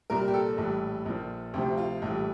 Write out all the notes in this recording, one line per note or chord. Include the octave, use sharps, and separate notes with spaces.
C2 A#2 G3 A#4
G4
A4
A#1 A2 E3 G3
A#1 A#2 F3
D2 C3 F3 G4
F4
A#1 A2 E3 G3